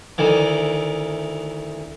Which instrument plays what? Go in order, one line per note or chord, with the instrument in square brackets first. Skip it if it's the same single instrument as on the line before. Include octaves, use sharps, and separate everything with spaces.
[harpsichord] D2 D#3 E3